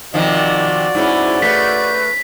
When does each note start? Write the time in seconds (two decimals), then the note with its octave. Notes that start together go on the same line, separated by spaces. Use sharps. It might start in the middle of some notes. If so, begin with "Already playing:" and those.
0.14 C3 D#3 F3 F#4 D5 D#5
0.95 G#2 C#4 E4
1.42 A3 B4 B6